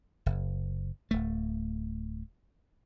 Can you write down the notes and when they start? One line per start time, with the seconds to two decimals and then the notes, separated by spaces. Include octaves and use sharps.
0.26 F#1
1.11 D1 A3